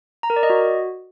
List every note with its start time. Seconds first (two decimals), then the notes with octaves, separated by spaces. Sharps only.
0.23 A#5
0.30 A#4
0.36 D5
0.43 D#5
0.50 F#4